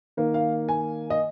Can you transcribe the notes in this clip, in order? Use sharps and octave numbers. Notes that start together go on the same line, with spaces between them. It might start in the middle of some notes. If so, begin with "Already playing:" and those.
D#3 A#3
F5
G#5
D#5